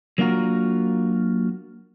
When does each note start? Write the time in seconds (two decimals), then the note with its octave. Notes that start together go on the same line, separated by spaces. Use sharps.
0.18 F#3 A#3 D4 F4 F#4 A#4